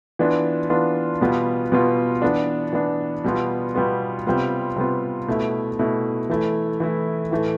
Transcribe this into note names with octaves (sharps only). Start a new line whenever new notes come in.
E3 B3 D4 F4
E3 B3 D4 F4
B2 G3 B3 F4
B2 G3 B3 F4
E3 B3 D4
E3 B3 D4
B2 G3 B3 F4
B2 G3 B3 F4
C3 G3 B3 F4
C3 G3 B3 F4
B2 A3 E4
B2 A3 E4
E3 A3 E4
E3 A3 E4
A2 E3 A3